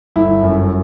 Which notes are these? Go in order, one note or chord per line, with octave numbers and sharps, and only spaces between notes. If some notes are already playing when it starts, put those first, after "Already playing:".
G1 E4
F#2